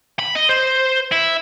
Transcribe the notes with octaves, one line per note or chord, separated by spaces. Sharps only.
B5
D#5
C5
E4